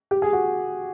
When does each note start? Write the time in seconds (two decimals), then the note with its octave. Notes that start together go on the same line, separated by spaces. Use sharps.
0.11 G4
0.22 G#4
0.33 F#4